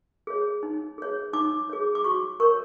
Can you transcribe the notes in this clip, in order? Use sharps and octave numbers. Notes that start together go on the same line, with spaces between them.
G#4 C#5
D#4
G#4 C#5
D#4 D6
G#4 C#5
D6
F#4 C#6
A#4 C#5 C#6